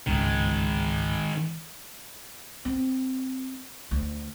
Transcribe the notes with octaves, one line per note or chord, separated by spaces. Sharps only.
G1 C#2 G#2 D#3 G#3
C4
D2